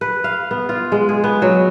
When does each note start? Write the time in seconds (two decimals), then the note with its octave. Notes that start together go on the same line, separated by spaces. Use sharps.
0.01 B4
0.24 F5
0.51 B3
0.69 F4
0.92 G#3
1.09 G#4
1.24 B3
1.42 F#3